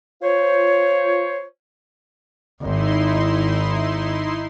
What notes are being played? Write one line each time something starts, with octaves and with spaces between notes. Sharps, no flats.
F4 C5 C#5
G#1 D#4 E4 C6